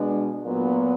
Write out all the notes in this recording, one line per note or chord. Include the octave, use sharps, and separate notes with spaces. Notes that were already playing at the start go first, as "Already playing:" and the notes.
Already playing: B2 G#3 D4
A#2 F#3 B3